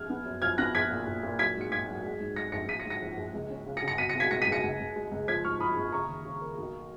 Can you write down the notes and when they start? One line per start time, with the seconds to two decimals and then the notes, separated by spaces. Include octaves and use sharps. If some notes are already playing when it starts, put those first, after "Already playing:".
Already playing: A#1 F6 G#6
0.10 B3
0.26 F#2
0.42 F3 F6 G#6
0.58 B3 F#6 A#6
0.75 A#1 G#6 B6
0.91 A#2
1.07 A#2
1.23 A#2
1.39 F#3 G#6 B6
1.55 G#2
1.61 C#7
1.71 G#2 G#6 B6
1.88 F#3
2.04 G#3
2.20 G#2
2.36 G#3 A#6 C#7
2.52 A#1 A#6 C#7
2.69 G#2 B6 D#7
2.80 A#6 C#7
2.85 G#2
2.90 A#6 C#7
3.02 F3
3.17 A#1
3.34 C#2
3.50 C#4
3.66 C#3
3.77 A#6 C#7
3.82 C#3
3.88 A#6 C#7
3.98 B2 B6 D#7
4.09 A#6 C#7
4.15 B2
4.20 G#6 B6
4.31 C#2 A#6 C#7
4.42 B6 D#7
4.47 C#2
4.52 A#6 C#7
4.64 C#2
4.80 C#2
4.96 G#3
5.11 C#2
5.28 F3 G#6 B6
5.44 G#2 C#6 F6
5.60 A#1 B5 D#6
5.76 A#1
5.92 C#3 A#5 C#6
6.09 D#2
6.25 C#3
6.41 A#3
6.58 B1